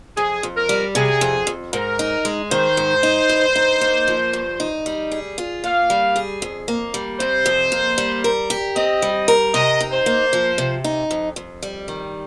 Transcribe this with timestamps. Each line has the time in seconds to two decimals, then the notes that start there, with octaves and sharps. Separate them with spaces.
0.17 F2 G#4
0.43 F2
0.56 A#4
0.69 G3
0.95 C3 G#4
1.21 F2
1.47 F2
1.73 G#2 A#4
1.99 D#4
2.25 G#3
2.51 D#3 C5
2.77 G#2
3.03 D#4
3.29 G2
3.56 D#4
3.81 A#3
4.08 F3
4.33 G2
4.60 D#4
4.86 G3
5.12 G#4
5.38 F4
5.64 A#3 F5
5.90 G3
6.16 G#4
6.42 F2
6.68 A#3
6.94 G3
7.20 C3 C5
7.46 F2
7.72 A#3
7.98 G3
8.24 A#4
8.50 G4
8.76 C4 D#5
9.02 G3
9.28 A#4
9.54 C3 D#5
9.80 D#4
9.93 C5
10.06 A#3
10.33 F3
10.58 C3
10.84 D#4
11.11 F2
11.36 F2
11.63 G3
11.88 D#3